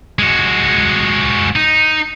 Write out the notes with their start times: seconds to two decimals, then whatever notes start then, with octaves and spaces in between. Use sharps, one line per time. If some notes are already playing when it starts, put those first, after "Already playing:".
0.19 G#3 F#4
1.56 D#4